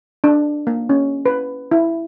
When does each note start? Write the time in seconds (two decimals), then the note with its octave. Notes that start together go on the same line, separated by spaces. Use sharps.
0.24 D4
0.67 A#3
0.89 C#4
1.26 B4
1.71 E4